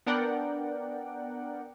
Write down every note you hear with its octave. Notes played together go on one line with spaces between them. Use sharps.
B3 D4 A#4 D5 F#5 G5